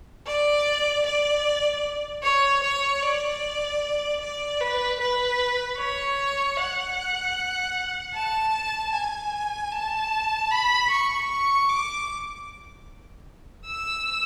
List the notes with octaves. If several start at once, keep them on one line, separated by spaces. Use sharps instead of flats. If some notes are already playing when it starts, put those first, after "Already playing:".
D5
D5
C#5
C#5
D5
D5
B4
B4
C#5
F#5
A5
G#5
A5
B5
C#6
C#6
D6
E6